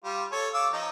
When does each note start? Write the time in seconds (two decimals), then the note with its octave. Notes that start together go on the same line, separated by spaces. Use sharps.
0.04 G3 F4
0.32 A4 C#5
0.54 F5 D6 E6
0.73 F3 D#4